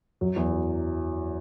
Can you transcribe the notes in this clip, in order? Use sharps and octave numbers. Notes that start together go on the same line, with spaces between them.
F#2 F#3
E2 E3
F#3